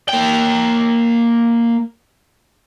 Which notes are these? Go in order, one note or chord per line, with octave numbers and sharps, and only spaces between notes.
A#3 G5